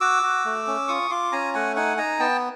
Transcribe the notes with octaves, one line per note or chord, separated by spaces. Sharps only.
F#4 D6 E6
F#4
A3
C#4
F4 C#6 D#6
F4 C6 D6
C#4 G#5 A#5
A3 F#5 G#5
D#4 F#5 G#5
D#4 G#5 A#5
B3 G5 A5